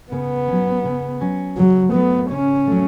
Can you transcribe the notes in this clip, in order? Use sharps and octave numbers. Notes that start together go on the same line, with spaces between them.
C#3 B3
F#3 C#4
C#3
F#3 C#4
C#3 F#3
F#3 A3 B3
C#3 C#4
F#3 A3